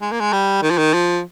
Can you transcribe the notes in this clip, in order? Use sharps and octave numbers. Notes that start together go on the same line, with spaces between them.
G#3
A#3
G#3
G3
D#3
F3
D#3
F3